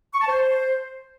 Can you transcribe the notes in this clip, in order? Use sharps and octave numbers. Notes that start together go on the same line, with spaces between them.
C#6
A5
C5